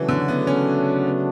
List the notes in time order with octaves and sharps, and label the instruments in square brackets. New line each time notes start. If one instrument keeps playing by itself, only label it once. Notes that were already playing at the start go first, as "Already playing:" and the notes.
Already playing: [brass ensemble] C#3 F#3 A3 D4 [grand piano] E3
[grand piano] D3
B3
C#4
B3